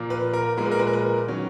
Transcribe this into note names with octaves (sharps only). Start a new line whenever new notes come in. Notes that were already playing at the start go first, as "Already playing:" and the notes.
Already playing: A#2 F3 A#3
B4
A#4
A#2 F3 G#3 A#4
B4
A#4
B4
A#4
B4
A#4
D#3 F#3 C#4